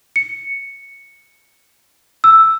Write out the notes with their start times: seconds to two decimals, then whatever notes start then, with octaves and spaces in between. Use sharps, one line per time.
0.16 C#7
2.24 E6